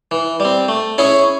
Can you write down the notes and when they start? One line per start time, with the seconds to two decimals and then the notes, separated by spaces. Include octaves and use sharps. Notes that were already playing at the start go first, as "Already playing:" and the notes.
0.11 E3
0.40 G3 C4
0.68 A3
0.98 C#4 E4 G#4 C#5